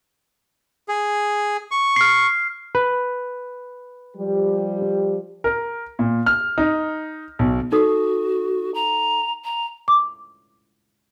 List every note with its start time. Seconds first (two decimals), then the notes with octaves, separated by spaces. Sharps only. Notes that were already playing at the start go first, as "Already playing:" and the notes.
0.88 G#4
1.71 C#6
1.96 F6 C7
2.75 B4
4.17 F3 G3 G4
5.44 A#4
5.99 A#2
6.26 F6
6.58 D#4
7.39 B1
7.72 D#4 F#4 A4 D#6
8.75 A#5
9.45 A#5
9.88 D6